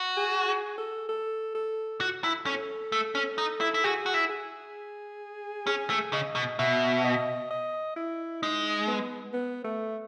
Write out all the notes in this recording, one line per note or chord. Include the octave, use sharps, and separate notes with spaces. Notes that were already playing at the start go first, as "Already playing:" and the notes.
Already playing: F#4
G#4
G#4
A4
A4
A4
F#4
E4
C#4 A4
A3
C#4
D#4
E4
E4
F#4 G#4
F#4
E4
G#4
C#4 G#4
A3
C#3 D#5
B2
B2 E5
D#5
D#5
E4
G#3 D#4
B3
B3
A3